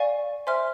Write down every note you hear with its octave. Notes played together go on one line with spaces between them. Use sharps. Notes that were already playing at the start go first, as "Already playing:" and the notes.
Already playing: D5 F5 G#5 C#6
C5 E5 G#5 C6 F6